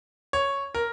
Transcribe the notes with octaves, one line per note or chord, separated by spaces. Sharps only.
C#5
A#4